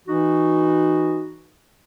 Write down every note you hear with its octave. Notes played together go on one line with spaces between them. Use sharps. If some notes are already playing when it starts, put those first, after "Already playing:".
E3 D#4 F#4